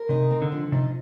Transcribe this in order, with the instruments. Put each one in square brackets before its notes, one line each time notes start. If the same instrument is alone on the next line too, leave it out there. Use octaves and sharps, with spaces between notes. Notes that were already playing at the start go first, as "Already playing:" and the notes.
Already playing: [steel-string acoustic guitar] A#4
[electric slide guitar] C3 [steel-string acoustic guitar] D#4
[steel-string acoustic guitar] C4
[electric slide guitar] D3
[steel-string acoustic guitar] F3
[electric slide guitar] C3 [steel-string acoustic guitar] D#4